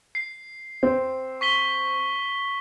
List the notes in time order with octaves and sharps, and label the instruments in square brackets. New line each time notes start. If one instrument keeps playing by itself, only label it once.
[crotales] C7
[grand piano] C4
[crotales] C#6 B6 G7